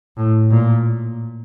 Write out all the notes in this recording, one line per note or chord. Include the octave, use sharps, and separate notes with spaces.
A2
A#2